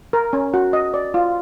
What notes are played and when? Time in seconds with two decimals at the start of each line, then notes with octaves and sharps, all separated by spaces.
0.13 A#4
0.33 C#4
0.54 F#4
0.73 D#5
0.94 D5
1.14 F4